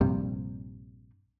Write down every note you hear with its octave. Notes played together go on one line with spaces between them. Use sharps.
A#1 G2 C3 G3